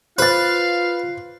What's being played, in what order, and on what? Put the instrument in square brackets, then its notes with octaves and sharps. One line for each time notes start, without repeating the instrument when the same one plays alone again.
[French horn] F4 [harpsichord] B4 [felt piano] C5 A6 [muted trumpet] F5